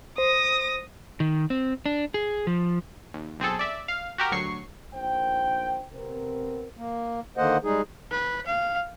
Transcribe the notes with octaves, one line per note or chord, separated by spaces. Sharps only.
C5 D#6 A#6
D#3
C4
D4
G#4
F3
D#2
B1 C4 G#4 A4
D5 E5
F5
F#4 G4 A#4
D2 F#3 C#6 C7
A#1 D#3 C5 G5
C3 B3 C4 A#4
A#3
D3 D#3 A#3 C5 D#5 F#5
G3 G#3 D#4 G#4
B4
F5